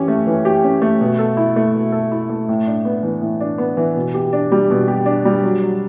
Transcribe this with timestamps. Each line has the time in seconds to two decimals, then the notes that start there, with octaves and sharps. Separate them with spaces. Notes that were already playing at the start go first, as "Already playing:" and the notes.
Already playing: E3 C#4 G4
0.08 A3
0.26 E3
0.45 G4
0.64 C#4
0.82 A3
1.01 B2
1.19 A4
1.37 E4
1.56 A3
1.74 B2
1.92 A4
2.12 E4
2.30 A3
2.49 A2
2.67 D4
2.85 B3
3.03 E3
3.22 A2
3.40 D4
3.58 B3
3.77 E3
3.95 B2
4.14 G4
4.33 D4
4.52 G3
4.70 B2
4.88 G4
5.06 D4
5.25 G3
5.43 F#3
5.62 F#3